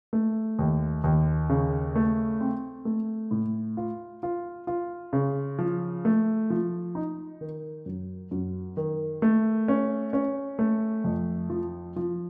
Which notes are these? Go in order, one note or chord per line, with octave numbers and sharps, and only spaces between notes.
A3
D#2
D#2
C#3
A3
C4
A3
A2
F4
F4
F4
C#3
F3
A3
F3
D#4
D#3
F#2
F#2
D#3
A3
C#4
C#4
A3
F2
F3
F3